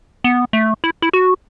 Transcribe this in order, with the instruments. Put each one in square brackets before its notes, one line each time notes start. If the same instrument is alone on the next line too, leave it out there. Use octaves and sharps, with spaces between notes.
[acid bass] B3
A3
E4
E4
F#4